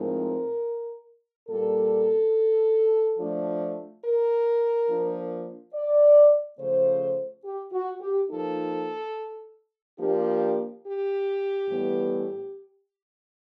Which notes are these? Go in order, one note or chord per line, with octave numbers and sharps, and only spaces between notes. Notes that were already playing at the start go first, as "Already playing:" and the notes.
Already playing: A2 F3 G#3 C4 D#4 A#4
A#2 G3 A#3 A4
F3 A3 D4
A#4
F3 A#3 D4
D5
C#3 F3 A3 C5
G4
F#4
G4
F3 A#3 D#4 A4
F3 A#3 D4 G4
G4
A2 E3 G3 B3